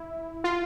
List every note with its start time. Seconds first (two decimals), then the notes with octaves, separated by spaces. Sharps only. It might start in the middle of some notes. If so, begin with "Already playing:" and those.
Already playing: E4
0.44 F4